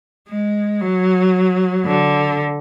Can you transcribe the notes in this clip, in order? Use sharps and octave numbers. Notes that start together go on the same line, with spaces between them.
G#3
F#3
D3